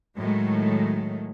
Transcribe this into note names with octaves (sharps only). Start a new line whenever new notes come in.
A2 D#3 F#3 G#3 A3